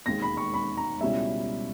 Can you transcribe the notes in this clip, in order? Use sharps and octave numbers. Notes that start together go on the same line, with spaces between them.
E1 D#2 D#3 G#3 A#6
B5
C#6
B5
A#5
C#2 B2 G3 C#4 E4 E5